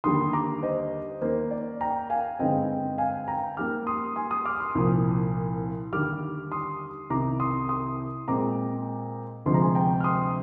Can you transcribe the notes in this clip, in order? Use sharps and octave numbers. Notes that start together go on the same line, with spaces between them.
D#2 D3 G3 A#3 C6 D#6
A#5 D6
C5 D#5
D#2 D#3 A#3 C5
D5
G5 A#5
F5 G#5
G2 D3 G#3 C4 D#5 G5
F5 G#5
G5 A#5
G#2 G3 A#3 D6 F6
C6 D#6
G#5 C6
C6 D#6
D6 F6
C6 D#6
C2 A#2 F3
D#2 D3 G3 D6 F6
C6 D#6
C2 C3 D#3 A#5 D6
C6 D#6
C6 D#6
A#2 G#3 C4 A#5 D6
D2 C3 F3 G#3 C6
A#5
G#5 C6
G5 A#5
F6
C6 D#6